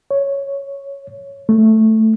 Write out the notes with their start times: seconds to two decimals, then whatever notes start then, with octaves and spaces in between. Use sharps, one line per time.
0.11 C#5
1.49 A3